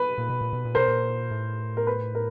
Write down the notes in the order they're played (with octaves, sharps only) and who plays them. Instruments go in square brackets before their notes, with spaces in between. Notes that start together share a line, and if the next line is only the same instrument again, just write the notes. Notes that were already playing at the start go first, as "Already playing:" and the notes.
Already playing: [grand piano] B4
[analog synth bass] A#2
B2
A#2
B2
A#2
[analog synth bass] B2 [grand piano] A#4 C5
[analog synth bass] A#2
A2
[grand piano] A#4
B4
A#4